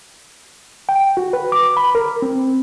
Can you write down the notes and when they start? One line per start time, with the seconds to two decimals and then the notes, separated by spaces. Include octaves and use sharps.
0.89 G5
1.17 F#4
1.33 B4
1.52 D6
1.77 B5
1.95 A#4
2.22 C4